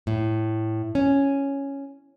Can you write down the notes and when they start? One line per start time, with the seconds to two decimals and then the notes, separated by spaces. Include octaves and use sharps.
0.07 A2
0.95 C#4